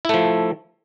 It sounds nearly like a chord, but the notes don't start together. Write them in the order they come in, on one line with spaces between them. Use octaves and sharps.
E4 A3 F3